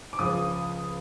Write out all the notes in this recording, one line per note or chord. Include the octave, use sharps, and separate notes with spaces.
D6
C#2 C#3 F3 D#6